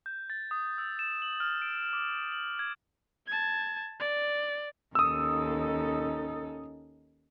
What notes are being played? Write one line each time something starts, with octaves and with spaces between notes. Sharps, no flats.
G6
A6
D#6
E6
E7
F#7
F6
D7
D6
F#7
G#6
A5 G#6
D5
D#2 C#4 D#4 A4 D#6 E6